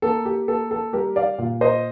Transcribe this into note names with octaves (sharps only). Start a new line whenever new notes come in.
A#3 A4
G4
A#3 A4
A4
G3 G4 A#4
D5 F5
A#2
C5 D#5